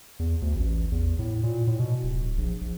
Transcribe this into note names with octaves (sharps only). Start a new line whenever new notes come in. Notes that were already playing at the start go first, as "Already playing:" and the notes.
E2
D2
A1
E2
A2
A#2
A2
B2
D1
A#1
A#1